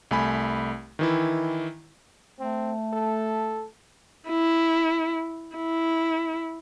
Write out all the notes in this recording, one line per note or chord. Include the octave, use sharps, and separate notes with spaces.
C2 A3 G#5 B5
D#3 E3 E4
A3 C4
A4
E4
E4